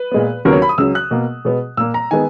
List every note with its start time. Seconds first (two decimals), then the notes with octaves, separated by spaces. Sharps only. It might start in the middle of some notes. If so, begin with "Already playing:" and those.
Already playing: B4
0.12 A#2 G#3 B3
0.45 D#2 C#3 F#3 B3 A#4
0.53 C#5
0.62 B5
0.69 D#6
0.78 C#2 C#3 F#3 E6
0.95 F#6
1.11 B2 A#3
1.45 B2 G#3 B3
1.77 A#2 A#3 E6
1.94 A#5
2.11 D#3 G#3 B3 G#5